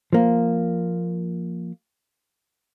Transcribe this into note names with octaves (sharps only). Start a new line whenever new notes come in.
F3 A#3